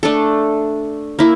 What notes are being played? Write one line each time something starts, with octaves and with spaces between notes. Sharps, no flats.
A3 D4 A4
A#3 E4